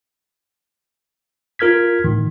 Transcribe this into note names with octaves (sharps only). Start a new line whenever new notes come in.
F4 A#4 F6 G#6 B6
A2 D#3 E3